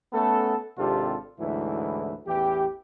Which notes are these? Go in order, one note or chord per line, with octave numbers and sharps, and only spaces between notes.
A3 B3 C#4 A4
G#1 C3 D4 F4 G4 A4
D2 G#2 E3 F#3 E4
A1 E2 E3 G4